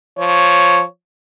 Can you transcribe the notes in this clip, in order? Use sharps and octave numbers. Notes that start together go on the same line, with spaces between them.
F3 C#5